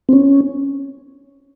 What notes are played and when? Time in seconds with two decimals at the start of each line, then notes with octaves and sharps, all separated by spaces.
0.09 C4
0.13 C#4